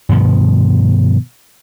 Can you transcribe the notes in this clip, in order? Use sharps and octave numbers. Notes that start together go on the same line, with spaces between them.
G2 B2 D#3 F3